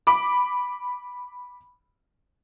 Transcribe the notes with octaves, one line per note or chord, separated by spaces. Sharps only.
B5 D6